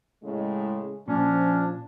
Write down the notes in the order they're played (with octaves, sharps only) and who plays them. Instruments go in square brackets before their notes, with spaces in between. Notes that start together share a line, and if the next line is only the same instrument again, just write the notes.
[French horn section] A2 C#3 G#3
[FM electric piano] A#2 [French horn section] F3 [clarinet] C#4 [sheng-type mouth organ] D4